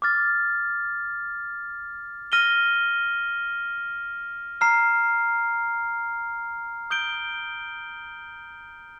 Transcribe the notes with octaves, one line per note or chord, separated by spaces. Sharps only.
D6 F6 A6
F6 A#6 D#7 G7
A#5 F6 C7
D#6 G6 D7 G7